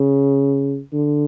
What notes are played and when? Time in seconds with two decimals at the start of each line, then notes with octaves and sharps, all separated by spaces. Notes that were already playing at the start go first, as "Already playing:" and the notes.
Already playing: C#3
0.93 D3